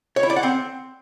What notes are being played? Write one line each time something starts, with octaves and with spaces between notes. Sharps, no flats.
C#5
E4
D5
F#5
C4